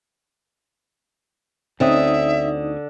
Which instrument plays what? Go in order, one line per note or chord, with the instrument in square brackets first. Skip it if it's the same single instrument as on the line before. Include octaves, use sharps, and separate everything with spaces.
[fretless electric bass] D2 C4 C#4 [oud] D3 [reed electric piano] D#4 D#6 [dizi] E5